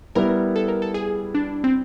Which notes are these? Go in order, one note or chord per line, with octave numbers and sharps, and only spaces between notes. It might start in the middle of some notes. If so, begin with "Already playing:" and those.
G3 B3 E4 A#4
A4
A#4
A4
G#4
D4
C4